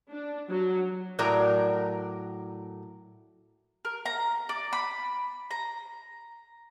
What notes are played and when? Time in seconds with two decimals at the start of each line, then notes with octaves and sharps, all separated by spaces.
0.11 D4
0.48 F#3
1.19 A2 F#3 A#4 D5 A#5
3.85 A#4
4.06 A#5
4.49 D5
4.73 B5
5.51 A#5